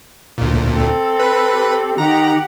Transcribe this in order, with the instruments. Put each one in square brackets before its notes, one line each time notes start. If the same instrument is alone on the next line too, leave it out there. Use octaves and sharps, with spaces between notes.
[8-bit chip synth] D2 A#2
[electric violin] C4 A4
[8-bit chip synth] B4
[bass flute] G4
[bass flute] D#3 [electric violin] G4 F#5 [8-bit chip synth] A#5